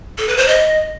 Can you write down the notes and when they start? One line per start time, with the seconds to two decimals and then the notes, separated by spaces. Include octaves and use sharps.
0.18 A4
0.28 B4
0.38 C5
0.48 D#5